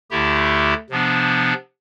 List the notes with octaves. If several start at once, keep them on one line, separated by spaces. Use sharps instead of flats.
D2 D3 A3 E4 G4
C3 F3 B3 D4